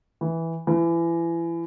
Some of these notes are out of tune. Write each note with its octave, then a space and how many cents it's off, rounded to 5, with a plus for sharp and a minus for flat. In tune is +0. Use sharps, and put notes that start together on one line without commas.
E3 -5
E3 +30